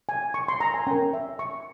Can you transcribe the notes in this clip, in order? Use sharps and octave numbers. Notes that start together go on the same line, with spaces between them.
G#5
C#6
C6
A#5
G#5
C#4 G4 A#4 G5
E5
C#6